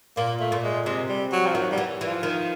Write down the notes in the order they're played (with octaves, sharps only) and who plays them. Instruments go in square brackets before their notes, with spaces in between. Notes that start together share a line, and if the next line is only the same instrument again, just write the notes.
[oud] A#2 [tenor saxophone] A#3
[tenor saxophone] A3
[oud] A#2
[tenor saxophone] G#3
[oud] C3 [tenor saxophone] G#3
[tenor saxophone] G3
F#3
F3
[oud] D#3 [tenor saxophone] F#3
[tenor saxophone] G3
[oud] E3
E3
[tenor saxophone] F3
[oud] D#3